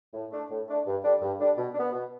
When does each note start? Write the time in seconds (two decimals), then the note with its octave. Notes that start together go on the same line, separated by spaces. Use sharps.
0.13 A2
0.31 A3 D4
0.50 A2
0.68 A3 D4
0.86 G2
1.03 D3 G3 D4
1.21 G2
1.39 D3 G3 D4
1.56 B2
1.74 D4
1.80 B3
1.92 B2